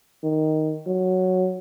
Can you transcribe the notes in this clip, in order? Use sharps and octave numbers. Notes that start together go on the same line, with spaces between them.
D#3
F#3